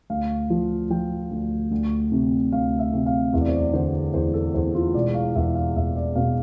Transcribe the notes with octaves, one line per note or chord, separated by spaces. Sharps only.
D2 F5
F3
F3 G5
D2
D2
C3
D2 F5
E5
C3
F5
E2 E5
D5
C5
D5
D3 C5
E2 C5
A4
E2 C5
F4
E1 D5
F5
E2 E5
F5
E2 E5
D5
B2 F5